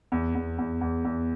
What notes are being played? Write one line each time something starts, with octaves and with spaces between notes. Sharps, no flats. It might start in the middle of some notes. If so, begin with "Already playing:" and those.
E2
E2
E2
E2
E2